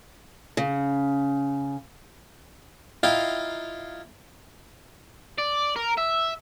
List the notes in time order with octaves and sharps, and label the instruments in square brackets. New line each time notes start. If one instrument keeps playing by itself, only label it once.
[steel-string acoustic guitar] C#3
[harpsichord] E4 F4 D#5 F5 G5 A#5
[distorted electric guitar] D5
A#4
E5